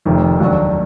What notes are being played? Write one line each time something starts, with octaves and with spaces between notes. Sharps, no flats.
F1 F2 D#3
D#2 D#3 F#3 D4 F#4